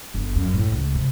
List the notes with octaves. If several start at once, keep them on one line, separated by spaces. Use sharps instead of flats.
G1
F#2
A2
C#2
C3